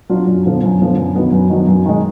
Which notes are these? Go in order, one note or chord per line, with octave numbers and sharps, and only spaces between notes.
F#3 D4 F4
F#2
D3 F3 B3
F#2
D3 F3 B3
F#2
D#3 F#3 B3 D4
F#2
D#3 F#3 B3 D4
F#2
D#3 G#3